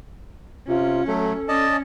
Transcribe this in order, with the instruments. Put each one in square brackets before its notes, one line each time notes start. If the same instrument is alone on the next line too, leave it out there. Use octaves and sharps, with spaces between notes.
[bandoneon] C3 [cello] C#4 [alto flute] F4
[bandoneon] F#3 A3 [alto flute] A4
[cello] C#4 [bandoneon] D5 D#5 A5